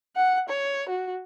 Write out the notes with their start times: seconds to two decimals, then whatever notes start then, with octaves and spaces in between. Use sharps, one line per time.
0.16 F#5
0.49 C#5
0.89 F#4